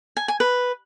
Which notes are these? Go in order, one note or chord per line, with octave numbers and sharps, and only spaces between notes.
G#5
G#5
B4